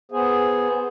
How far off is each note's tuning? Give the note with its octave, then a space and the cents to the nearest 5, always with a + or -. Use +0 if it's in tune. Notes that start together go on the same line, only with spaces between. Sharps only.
B3 +0 G#4 +0 C5 +0